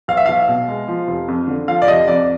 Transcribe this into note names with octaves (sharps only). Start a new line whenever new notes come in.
B1 F5
E5
B1 F5
B2
G#3
F3
F1
F2
D3
F3 F5
D5
F1 D#5
F2 D5